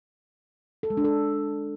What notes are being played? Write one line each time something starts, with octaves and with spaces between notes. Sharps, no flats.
A4
G#3
D4
A4